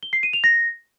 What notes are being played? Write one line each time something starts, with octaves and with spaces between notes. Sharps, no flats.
G7
C7
D#7
F7
A#6